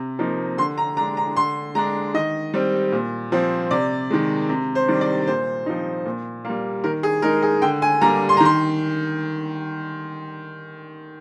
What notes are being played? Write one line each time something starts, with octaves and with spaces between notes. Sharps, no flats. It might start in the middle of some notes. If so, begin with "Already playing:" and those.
Already playing: C3
F3 A#3 D#4
D3 C6
A#5
G#3 D4 A#5
A#5
D3 C6
G#3 D4 A#5
D#3 D#5
G3 C4
A#2
F3 C4
C3 D5
D#3 G#3
C3
C5
D#3 G3 D4
D5
A#2 C5
F3 C4 D#4
A#2
G3 A#3
D#3 A#4
G#4
G#3 D#4 A#4
G#4
D3 G5
G#5
G3 A#3 D4 A#5
C6
A#5
D#3 C6